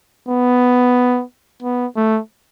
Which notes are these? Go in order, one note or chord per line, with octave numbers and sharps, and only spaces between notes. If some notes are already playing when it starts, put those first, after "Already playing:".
B3
B3
A3